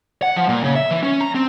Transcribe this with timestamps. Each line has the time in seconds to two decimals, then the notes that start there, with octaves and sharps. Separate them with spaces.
0.22 F#5
0.36 F3
0.49 A#2
0.64 C#3
0.75 E5
0.91 E3
1.03 C#4
1.21 A#5
1.35 C4